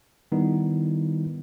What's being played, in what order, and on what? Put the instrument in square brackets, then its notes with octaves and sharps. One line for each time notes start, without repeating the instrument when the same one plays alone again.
[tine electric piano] D#3 G3 B3 D#4 E4